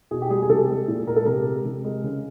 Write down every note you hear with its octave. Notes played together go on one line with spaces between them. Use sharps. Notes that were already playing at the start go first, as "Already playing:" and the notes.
B2 G#4
G4
G3 G#4
G#4
C3 A4
G#3
A#2
G#3 A#4
A4
C3 A#4
G#3
C3
G#3
C#3